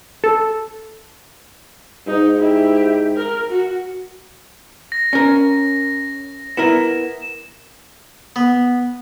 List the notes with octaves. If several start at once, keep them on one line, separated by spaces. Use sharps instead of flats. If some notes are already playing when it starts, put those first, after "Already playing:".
A4
G#2 D#4
E4 G4
A#4
F#4
A#6
C#4 A#4
B3 E4 A#4 E7
B3